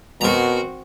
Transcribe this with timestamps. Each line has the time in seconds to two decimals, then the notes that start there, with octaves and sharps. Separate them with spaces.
0.21 B2 C4 F#4 A#4 A#5